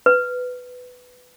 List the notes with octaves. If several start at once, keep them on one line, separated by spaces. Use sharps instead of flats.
B4